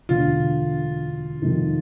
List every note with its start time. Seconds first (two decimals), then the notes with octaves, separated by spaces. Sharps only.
0.09 E1 D2 D3 F4
1.42 F2 C3 D#3